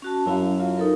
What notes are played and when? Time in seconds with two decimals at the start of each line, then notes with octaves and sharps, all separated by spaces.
0.02 C#4 F#4 A5
0.26 F#2 E4 F5
0.60 F4
0.77 D#4 A4 A#4